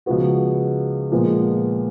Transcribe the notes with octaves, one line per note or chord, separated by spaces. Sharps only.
C#2 C#3 F3 B3 F#4
A#2 F3 G#3 B3